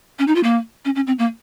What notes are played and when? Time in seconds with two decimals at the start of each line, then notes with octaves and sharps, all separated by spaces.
0.19 C#4
0.27 D#4
0.35 F4
0.43 A#3
0.85 C#4
0.95 C#4
1.07 C4
1.19 A#3